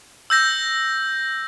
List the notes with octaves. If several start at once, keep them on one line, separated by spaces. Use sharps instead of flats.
E6 G6 A#6